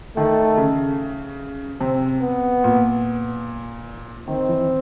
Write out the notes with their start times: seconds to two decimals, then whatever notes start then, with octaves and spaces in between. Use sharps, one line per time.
0.17 D#3 A3
0.57 C#3
1.81 C3 C4
2.22 B3
2.64 A#2
4.28 D#3 C4
4.48 E3